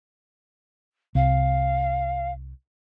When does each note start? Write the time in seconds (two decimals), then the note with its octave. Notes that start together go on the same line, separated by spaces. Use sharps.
1.15 C2 F5